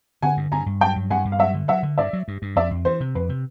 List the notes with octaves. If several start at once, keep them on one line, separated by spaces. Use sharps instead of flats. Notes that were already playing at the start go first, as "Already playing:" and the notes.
D3 F#5 G#5
G2
G2 G#5 A#5
G2
F#3 G5 A5
G2
G2 F#5 G#5
G2
F5
F#3 E5 F#5
D3
F#3 E5 F#5
D3
G2 D5 E5
F#3
G2
G2
F2 D5 E5
F2
E3 C5
C3
F2 B4
C3